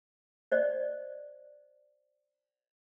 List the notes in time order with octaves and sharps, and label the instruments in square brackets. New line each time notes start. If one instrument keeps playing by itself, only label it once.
[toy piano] C5 D5 D#5